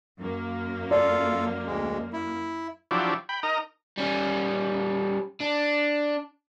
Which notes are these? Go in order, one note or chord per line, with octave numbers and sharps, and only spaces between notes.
F#2 A#3
F4 A4 D5 F5
D2 G#3
E4
F3 F#3 D4 E4 G4
G5 B5
D#4 A#4 D#5 A#5
G3 C#4
D4